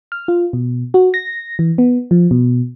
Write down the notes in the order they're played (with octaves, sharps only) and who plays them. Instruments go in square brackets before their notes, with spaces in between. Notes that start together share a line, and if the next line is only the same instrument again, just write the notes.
[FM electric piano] F6
F4
B2
F#4
A#6
E3
B3
F3
B2